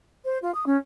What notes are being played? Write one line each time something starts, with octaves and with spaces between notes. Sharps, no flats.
C5
F4
D#6
C#4